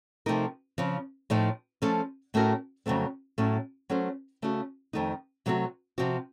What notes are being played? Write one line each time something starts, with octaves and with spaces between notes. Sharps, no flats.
C3 F3 A3 D#4 A#4
C#3 F3 C4
A2 F3 A3 D#4
F3 A3 C#4 A4
A2 A3 C#4 F#4 A#4
F2 C#3 F#3 A3 C4
A2 F#3 A3 C#4
F#3 A3 C#4 A4 C5
C#3 A3 C#4 F#4
F2 D#3 A3 D#4
C3 F#3 A3 C4 F#4
C3 F3 C4 F#4